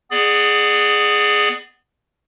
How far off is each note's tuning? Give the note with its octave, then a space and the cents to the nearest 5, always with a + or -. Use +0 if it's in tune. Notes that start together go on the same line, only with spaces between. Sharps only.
B3 +0 G#4 +0 D5 +30